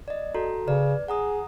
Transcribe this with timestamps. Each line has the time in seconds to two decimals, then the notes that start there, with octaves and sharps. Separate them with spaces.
0.08 D5 D#5
0.35 F#4 A4 A#5
0.67 C#3 B4 D5
1.08 G#4 F#5 A#5 D#6